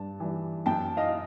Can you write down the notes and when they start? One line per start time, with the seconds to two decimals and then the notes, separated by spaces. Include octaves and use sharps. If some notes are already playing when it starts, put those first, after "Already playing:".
Already playing: G2 A5
0.20 E3 G3
0.66 F#2 G5 A5
0.97 D#5 F5